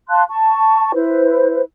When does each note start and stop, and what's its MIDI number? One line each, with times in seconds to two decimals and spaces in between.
0.09 0.22 77
0.09 0.22 81
0.09 0.22 84
0.09 0.22 90
0.29 0.91 81
0.29 0.91 85
0.94 1.61 64
0.94 1.61 71
0.94 1.61 72